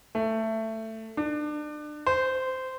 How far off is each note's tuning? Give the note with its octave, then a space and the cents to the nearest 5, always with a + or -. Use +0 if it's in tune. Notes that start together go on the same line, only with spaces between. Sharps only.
A3 +15
D4 +30
C5 -15